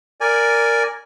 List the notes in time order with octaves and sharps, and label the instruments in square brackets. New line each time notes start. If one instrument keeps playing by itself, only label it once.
[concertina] A#4 D5 G#5